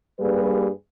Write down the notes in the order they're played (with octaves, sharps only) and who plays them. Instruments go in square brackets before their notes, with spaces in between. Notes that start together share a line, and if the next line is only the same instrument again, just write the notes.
[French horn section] G2 G3 A#3 G#4 B4